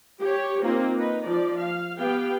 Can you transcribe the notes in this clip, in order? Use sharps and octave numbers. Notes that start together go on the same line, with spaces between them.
G4 C#5
A#3 C4 D#4 F4
D#4 B4
F3 D5
F5
B3 G4 F5 G5